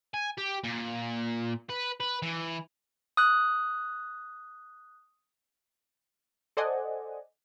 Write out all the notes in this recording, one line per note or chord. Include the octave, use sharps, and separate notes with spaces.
G#5
G4
A#2
B4
B4
E3
D#6 F#6
A4 C5 D5 D#5 F#5 G#5